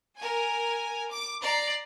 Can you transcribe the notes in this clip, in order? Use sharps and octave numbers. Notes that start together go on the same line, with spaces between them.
A#4 G#5
D6
D5 A#5 C7